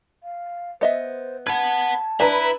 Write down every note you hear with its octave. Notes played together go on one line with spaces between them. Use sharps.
F5
B3 C5 D#5 E5
B4 F#5 A5 G#6
D4 E4 B4 G#5 A#5